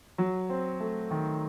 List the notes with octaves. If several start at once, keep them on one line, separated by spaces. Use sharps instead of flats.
F#3
C4
A3
D#3